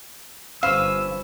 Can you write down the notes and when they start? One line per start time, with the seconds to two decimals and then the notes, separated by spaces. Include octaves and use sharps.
0.63 G1 C#4 B4 C5 F5 E6